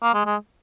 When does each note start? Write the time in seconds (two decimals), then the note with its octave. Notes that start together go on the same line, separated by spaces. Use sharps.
0.02 A#3
0.14 G#3
0.26 G#3